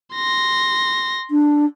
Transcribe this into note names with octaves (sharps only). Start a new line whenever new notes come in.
C6 A#6
D4